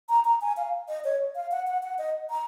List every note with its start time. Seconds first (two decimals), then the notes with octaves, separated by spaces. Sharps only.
0.09 A#5
0.25 A#5
0.41 G#5
0.57 F5
0.89 D#5
1.04 C#5
1.36 F5
1.51 F#5
1.67 F#5
1.83 F#5
1.99 D#5
2.31 A#5